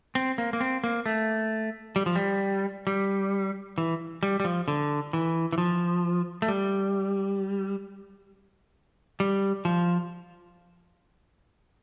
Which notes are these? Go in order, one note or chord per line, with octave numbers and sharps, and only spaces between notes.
C4
A#3
A#3
C4
A#3
A3
G3
F3
G3
G3
E3
G3
G3
F3
D3
E3
E3
F3
A3
G3
G3
F3